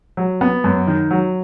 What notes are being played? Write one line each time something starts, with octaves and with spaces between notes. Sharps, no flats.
F#3
B3
F#2
D#3
F#3